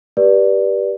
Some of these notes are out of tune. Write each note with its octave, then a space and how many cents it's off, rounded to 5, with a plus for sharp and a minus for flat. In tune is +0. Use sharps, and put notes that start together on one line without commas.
G4 +0 B4 -25 D5 +0